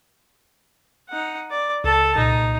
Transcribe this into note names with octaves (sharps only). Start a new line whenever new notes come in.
D#4 F#5
D5
C#2 A4 A5
C2 A#2 D#4